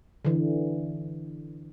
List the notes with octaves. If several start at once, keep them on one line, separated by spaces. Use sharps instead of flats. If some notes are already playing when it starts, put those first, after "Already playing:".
D3 E3